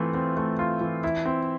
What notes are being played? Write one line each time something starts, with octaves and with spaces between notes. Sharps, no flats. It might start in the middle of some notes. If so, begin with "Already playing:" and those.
Already playing: E3 A3 C4 F4
C4
A3
F4
E3
E4
C4